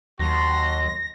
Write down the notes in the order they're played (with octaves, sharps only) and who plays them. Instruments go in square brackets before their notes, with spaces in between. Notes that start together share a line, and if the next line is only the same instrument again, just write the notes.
[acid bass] D#2 [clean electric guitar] F#3 [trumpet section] F#4 A5 C6 [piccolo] A#6